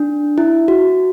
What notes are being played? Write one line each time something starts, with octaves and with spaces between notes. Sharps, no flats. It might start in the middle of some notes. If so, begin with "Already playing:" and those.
Already playing: D4
E4
F#4